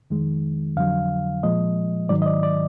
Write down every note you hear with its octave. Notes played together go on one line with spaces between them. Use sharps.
F2 D#3 G#3
F2 D3 F#3 F5
A#2 F3 G#3 D#5
G#2 D#3 F#3 D5
D#5
D5
D5